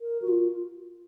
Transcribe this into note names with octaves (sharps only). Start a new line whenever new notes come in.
A#4
F#4
F4